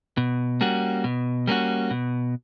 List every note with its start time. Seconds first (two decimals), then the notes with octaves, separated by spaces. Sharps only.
0.17 B2
0.61 G3 A#3 C#4 F#4
1.04 B2
1.47 G3 A#3 C#4 F#4
1.91 B2